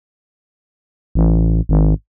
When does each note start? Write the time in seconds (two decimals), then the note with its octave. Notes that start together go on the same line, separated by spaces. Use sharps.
1.15 A1
1.69 G#1